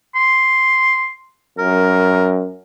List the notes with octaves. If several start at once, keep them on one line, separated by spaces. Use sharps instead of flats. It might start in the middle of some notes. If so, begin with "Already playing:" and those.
C6
F#2 A#4